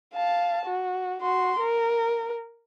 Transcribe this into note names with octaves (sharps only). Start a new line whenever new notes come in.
F5 A5
F#4
F#4 C6
A#4